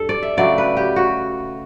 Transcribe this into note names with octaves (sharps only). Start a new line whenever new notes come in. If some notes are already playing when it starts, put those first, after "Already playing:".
Already playing: G2 A4
D5
E5
C#3 F#3 A3 D5
B4
G4
F#4